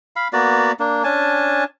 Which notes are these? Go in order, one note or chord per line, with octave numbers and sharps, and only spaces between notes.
F5 B5
A#3 B3 F#4 D5
A#3 D4
C#4 D4 G#5 A5